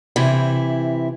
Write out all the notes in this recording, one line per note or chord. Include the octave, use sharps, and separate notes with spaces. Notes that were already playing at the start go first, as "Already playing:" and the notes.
C3 E3 E4